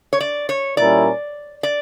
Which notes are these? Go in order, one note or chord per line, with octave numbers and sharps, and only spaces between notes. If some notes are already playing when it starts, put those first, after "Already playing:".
C#5
D5
C#5
A#2 G3 C#4 E4 A#4 D5
D5